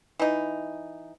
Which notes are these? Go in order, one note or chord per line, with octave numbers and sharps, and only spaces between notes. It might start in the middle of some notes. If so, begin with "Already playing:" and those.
E3 D#4